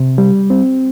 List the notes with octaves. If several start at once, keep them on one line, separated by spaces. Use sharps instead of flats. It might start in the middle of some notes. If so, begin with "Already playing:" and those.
Already playing: C3
G3
C4